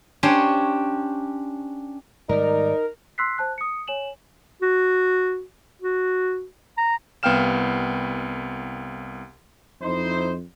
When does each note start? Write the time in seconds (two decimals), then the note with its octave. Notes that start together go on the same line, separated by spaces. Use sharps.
0.23 C#4 D4 G4 C5 C#5
2.29 G#2 D#3 G3 D#4 A#4 D5
3.18 C6 E6 F#6 B6 C7
3.38 C5 A5 F#6
3.58 D#6 C#7
3.88 C#5 G#5 E7 F#7
4.62 F#4
5.82 F#4
6.78 A#5
7.23 C2 B3 F5 G5 F6 E7
9.81 F2 D#4 E4 C5